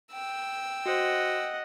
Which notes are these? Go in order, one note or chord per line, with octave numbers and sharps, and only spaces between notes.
G5 E6
F#4 C5 D#5 F#5